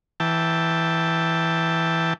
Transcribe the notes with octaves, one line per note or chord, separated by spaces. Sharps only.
E3 G5 A5